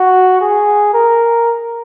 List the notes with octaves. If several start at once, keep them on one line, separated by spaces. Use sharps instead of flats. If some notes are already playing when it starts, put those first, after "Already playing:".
Already playing: F#4
G#4
A#4